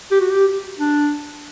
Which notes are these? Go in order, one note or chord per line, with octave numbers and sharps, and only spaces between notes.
G4
F#4
G4
D4